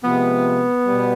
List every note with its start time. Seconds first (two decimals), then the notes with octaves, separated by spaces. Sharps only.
0.03 C3 F3 G#3 B3
0.85 B2 G3